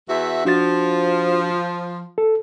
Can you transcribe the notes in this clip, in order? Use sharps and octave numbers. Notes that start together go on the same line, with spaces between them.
E2 F#4 E5
F3 D4 F#4 A6
A4